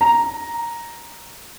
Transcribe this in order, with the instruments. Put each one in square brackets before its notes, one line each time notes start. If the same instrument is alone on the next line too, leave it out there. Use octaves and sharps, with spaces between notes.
[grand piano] A#5